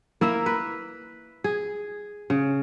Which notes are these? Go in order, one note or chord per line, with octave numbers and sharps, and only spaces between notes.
A#3 E4 A#4 E5
B4
G#4
C#3